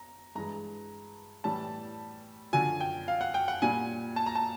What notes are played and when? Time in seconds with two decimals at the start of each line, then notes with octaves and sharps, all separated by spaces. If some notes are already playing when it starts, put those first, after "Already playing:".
Already playing: A#5
0.35 G2 E3 G#3 A#5
1.44 A2 E3 G3 A5
2.53 F#2 D3 F3 G#5
2.81 G5
3.08 F5
3.21 F#5
3.34 G5
3.48 F#5
3.62 A#2 G3 G#5
4.16 A5
4.26 A#5
4.35 A5